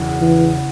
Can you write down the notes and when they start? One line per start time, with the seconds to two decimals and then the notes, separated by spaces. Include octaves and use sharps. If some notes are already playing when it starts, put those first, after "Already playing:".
Already playing: E1 E2 C#3
0.21 E3